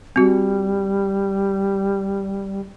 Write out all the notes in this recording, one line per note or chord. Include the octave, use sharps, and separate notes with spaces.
G3 C4 F#4